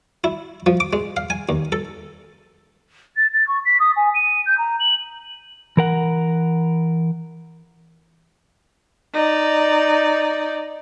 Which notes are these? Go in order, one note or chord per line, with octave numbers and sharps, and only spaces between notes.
E4
F3
D6
G#3
F5
G#5
D#2
A4
A6
A6
C#6
B6
D#6
G#5
D#7
G6
A#5
F#7
E3 A#4 F#5
D#4 D5